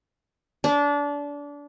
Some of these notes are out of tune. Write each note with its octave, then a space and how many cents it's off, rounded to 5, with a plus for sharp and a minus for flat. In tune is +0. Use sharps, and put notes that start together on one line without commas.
D4 -25